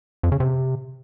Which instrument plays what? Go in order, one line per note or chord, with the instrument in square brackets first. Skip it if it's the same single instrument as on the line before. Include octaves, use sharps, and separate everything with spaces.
[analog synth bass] F2
C#3
C3